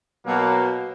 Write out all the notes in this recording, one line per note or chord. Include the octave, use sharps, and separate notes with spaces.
B2 F#3 A#3